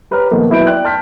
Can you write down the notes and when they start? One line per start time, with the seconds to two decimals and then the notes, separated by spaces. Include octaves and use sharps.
0.11 G4 B4 C#5 A#5 F6
0.31 A#2 D#3 F3 A3 B3
0.49 B2 F#3 E4 B4 G6 D7
0.67 D5 G5 F#6
0.85 A5 F6 G6 B6